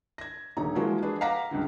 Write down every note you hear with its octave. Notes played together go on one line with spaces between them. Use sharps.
G#6 A#6
D#1 D3 D#4 A#5
E3 F3 G#3 A#3 F#4
D4 G#4 B4
F5 F#5 A#5 D6 A#6 B6
C#2 G2 D3